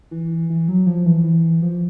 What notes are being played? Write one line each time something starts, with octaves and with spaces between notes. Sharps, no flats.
E3
E3
F#3
F3
E3
E3
F3